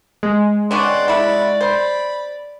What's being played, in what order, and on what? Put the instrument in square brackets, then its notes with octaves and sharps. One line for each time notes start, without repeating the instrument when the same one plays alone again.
[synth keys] G#3
[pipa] B3 C#4 D4 [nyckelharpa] D5 [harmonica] F#5 G5 C6
[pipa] D4 E4 [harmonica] F#5 B5 C#6
[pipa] C5 [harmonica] B5